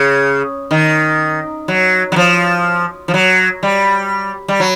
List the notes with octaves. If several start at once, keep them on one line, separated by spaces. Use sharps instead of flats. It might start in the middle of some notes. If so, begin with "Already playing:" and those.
Already playing: C#3
D#3
F#3
F#3
F3
F3
F#3
G3
G3
F#3